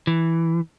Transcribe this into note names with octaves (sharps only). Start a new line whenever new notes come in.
E3